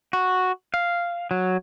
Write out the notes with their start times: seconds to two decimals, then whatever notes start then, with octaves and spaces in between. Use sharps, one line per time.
0.13 F#4
0.74 F5
1.31 F#3